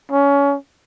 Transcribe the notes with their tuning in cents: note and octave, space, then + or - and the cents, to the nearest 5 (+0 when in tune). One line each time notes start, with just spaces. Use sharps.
C#4 +25